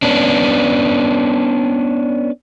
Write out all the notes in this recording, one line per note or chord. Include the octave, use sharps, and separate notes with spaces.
B3 C#4 D4